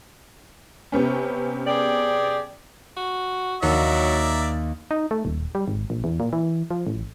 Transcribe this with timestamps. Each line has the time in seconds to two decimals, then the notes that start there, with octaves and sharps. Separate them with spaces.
0.92 C3 B3 C#4
1.67 G4 G#4 D5
2.97 F#4
3.63 D#2 F#3 A#4 D5 E5
4.91 D#4
5.11 A3
5.25 D#1
5.55 G3
5.68 G#1
5.90 A#1
6.04 E2
6.20 A#2
6.33 E3
6.71 F3
6.87 A1